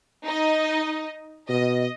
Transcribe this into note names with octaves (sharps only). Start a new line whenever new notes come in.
D#4 D#5
B2 D#5